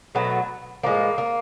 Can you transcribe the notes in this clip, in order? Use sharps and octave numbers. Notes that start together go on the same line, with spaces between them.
B2 F#3 A3
A2 F3 G#3 A#3
A#3